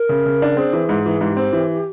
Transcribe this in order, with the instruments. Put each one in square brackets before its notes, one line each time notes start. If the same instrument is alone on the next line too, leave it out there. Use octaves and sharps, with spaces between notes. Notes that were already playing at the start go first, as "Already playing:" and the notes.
Already playing: [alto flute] A#4
[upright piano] C#3
C#3
D4
[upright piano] C4 [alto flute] G#4
[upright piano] E3
G#2
E3
[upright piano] G#2 [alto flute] G4
[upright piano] C4
E3